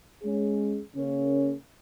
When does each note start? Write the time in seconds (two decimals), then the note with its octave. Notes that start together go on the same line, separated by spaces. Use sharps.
0.23 G#3 C#4 G#4
0.96 C#3 A#3 C#4